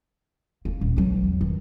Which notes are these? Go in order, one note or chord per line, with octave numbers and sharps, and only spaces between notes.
A#3 D#4
D#1
E3 F#3
E2
D#3 E3